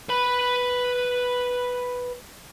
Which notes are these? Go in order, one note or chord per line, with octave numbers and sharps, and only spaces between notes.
B4 B5